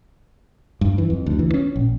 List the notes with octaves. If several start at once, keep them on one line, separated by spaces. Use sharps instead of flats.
G2
E3
F2
D2
E3
C#4
A#1